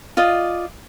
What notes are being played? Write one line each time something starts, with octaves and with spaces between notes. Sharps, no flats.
F4 D5 D#5